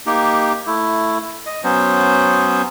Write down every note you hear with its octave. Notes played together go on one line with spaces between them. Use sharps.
A#3 D#4 G4
A3 E4
D#5
F#3 B3 C#4 C5